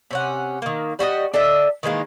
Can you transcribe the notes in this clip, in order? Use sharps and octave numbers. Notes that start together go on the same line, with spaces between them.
C3 C#4 F#5
D#3 A#3
G3 F#4 G4 D#5
D4 A4 D#5 E5
D#3 E3 G#3 A#3